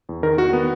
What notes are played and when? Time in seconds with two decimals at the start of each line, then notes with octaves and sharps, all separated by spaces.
0.09 E2
0.23 D#3 A#4
0.38 D#3 F#4
0.53 B3